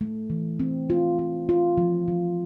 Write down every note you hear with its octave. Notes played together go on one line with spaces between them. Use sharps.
A3
E3
C4
F4
F4
F4
F3
F3